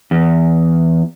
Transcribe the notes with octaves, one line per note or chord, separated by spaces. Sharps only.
E2